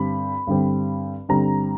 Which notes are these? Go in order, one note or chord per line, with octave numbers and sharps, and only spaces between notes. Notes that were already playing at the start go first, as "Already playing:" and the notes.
Already playing: G2 D3 G3 C4 B5
G2 D3 G3 C4
G2 D3 G3 C4 A#5